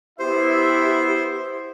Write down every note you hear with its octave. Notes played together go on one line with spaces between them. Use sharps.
B3 E4 G4 C5 E5